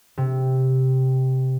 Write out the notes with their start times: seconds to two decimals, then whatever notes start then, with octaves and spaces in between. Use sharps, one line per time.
0.18 C3